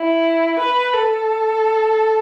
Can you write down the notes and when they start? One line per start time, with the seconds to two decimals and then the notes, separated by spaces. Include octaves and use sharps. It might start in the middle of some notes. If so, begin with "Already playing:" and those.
Already playing: E4
0.59 B4
0.93 A4